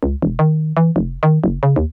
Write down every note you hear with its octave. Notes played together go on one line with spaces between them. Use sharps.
C#2
E1
D#3
E3
F1
D#3
F#1
C#3
D#2